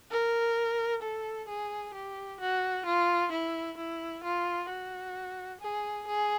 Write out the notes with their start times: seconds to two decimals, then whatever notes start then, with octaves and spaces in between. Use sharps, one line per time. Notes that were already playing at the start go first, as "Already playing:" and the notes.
0.11 A#4
1.02 A4
1.49 G#4
1.94 G4
2.40 F#4
2.86 F4
3.32 E4
3.77 E4
4.24 F4
4.70 F#4
5.61 G#4
6.07 G#4